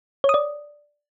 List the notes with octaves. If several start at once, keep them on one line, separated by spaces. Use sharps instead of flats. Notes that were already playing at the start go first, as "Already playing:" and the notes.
C#5
D#6
D5